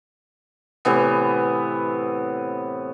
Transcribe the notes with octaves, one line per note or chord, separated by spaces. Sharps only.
A2 C3 E3 B3